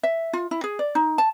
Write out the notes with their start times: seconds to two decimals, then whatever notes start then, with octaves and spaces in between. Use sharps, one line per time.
0.03 E5
0.33 F4
0.51 E4
0.64 G#4
0.79 D5
0.95 D#4
1.18 A5